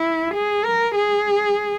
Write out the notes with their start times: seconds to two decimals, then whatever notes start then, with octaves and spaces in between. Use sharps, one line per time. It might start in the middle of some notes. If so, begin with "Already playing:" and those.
Already playing: E4
0.34 G#4
0.64 A#4
0.95 G#4